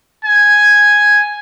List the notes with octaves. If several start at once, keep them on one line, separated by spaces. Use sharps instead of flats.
G#5